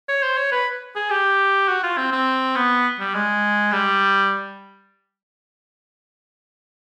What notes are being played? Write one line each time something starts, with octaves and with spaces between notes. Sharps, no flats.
C#5
C5
C#5
B4
G#4
G4
F#4
F4
C4
C4
B3
G3
G#3
G3